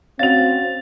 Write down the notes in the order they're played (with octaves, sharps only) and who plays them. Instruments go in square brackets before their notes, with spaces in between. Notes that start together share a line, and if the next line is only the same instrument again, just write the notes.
[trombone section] C4 [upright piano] C#4 F#4 F7 [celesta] F5 [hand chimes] A6